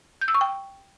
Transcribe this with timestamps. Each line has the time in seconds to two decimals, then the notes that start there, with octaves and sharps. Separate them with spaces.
0.21 G6
0.28 E6
0.34 C#6
0.41 G5